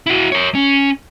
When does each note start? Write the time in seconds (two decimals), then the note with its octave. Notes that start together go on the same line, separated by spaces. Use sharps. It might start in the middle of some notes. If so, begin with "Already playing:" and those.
0.06 E4 F#4
0.32 A#4 C#5
0.55 C#4